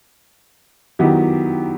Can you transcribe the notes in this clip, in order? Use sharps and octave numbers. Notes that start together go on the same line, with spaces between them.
D#3 F#3 B3 E4 G4